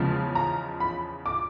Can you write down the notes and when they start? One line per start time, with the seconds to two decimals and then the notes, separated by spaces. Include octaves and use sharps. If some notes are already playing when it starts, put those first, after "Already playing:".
Already playing: E2 C#3 F3 G#3
0.35 A#5
0.80 B5
1.26 D6